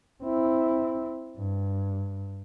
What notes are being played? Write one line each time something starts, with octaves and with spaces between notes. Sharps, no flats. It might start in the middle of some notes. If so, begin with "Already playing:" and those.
C4 E4
G2